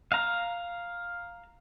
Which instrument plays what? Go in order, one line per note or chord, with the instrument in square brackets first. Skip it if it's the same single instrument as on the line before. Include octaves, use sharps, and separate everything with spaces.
[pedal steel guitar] F5 A#5